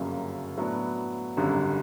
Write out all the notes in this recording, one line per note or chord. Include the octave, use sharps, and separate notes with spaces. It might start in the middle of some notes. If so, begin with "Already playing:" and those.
Already playing: G1 F#2 C#3 F#3 A#3
A2 F#3 B3 D4
G#1 F#2 D3 G3